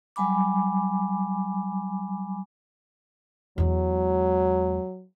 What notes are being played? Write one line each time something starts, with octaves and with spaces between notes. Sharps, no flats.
F#3 G3 G#5 B5 D6
E2 F#3 G#3